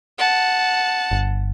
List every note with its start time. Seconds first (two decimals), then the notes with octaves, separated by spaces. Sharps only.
0.18 F#5 A5
1.11 G1